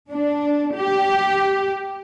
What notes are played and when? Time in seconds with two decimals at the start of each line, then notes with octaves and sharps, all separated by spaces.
0.11 D4
0.76 G4